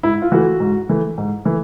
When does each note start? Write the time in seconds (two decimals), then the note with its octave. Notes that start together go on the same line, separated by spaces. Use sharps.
0.03 G#2 E4
0.22 F4
0.32 E3 A3 F#4
0.60 G#2
0.89 E3 A3
1.18 G#2
1.45 E3 A3